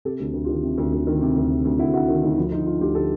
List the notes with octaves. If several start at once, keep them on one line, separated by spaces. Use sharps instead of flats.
C3 G4 A4
D2
D2
F4 G4
D#3
C3
D2
D2
D#3
C3
D2
C3
D2
D2 E4 F#4
D2 E4 F#4
D#3
D2 D#4
F3 E4
D3 D#4 F4
D3 D#4 F4
D2 F4 G4
D3 G4 A4